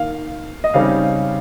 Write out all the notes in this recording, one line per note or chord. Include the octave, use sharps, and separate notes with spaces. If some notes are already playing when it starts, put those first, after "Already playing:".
Already playing: D#3 A#3 D#4 F5
D#5
C#3 G3 C4 D#4 F5